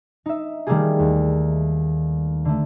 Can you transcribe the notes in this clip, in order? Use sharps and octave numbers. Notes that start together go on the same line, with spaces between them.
D#4 E5
D#3 G3 A3 A#3 G4 G#4
D#2
D3 A3